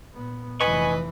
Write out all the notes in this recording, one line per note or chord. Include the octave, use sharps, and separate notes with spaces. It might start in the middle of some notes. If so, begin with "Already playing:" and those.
A#2 B3
F1 E3 B4 D#5 G#5 C#6